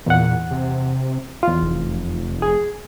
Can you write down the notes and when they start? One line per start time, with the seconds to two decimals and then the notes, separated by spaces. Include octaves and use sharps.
0.06 E2 A#2 F#5
0.51 C3
1.43 E2 F4
1.62 F1
2.42 G#4